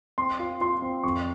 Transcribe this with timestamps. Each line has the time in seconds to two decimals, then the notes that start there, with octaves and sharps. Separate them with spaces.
0.18 C4 C6
0.39 F4
0.61 F4 C6
0.82 C4
1.03 F2 C#6